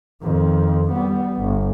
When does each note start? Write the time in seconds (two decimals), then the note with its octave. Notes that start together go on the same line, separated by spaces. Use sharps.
0.22 F2 D#3
0.91 G3 B3
1.41 G1